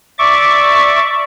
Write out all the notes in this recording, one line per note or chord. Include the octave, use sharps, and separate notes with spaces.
D5 E5 C#6 D6